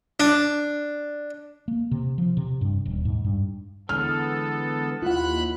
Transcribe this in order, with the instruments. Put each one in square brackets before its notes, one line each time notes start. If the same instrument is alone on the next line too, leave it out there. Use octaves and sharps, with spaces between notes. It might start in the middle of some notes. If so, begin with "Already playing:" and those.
[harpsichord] D4
[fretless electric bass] A#3
C3
F3
C3
G2
D#1
G#2
G2
[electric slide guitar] D3 E3 G#3 [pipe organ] B3 A4 [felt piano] F6
[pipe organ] D#2 B5 F#6 [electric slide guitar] E4 [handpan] F4 F#5